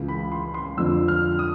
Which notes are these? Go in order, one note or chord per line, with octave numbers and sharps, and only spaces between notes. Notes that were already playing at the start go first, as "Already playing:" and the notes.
Already playing: C#2 C#3 E3
B5
C6
C6
F2 D3 F3 E6
F6
D#6